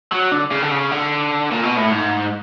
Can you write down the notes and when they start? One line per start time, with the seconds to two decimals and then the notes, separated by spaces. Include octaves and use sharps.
0.12 F#3
0.32 D3
0.51 C#3
0.62 D3
0.71 C#3
0.91 D3
1.51 A#2
1.63 B2
1.76 A2
1.90 G#2